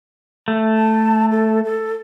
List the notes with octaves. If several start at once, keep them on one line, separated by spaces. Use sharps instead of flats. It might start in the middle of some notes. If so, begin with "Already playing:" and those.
A3
A5
A4
A4